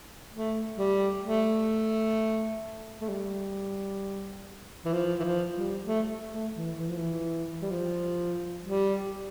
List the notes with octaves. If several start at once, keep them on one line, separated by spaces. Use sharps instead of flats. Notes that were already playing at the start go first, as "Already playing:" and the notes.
A3
G3
A3
A3
G3
E3
F3
E3
F3
G3
A3
A3
E3
E3
F3
E3
G3
F3
G3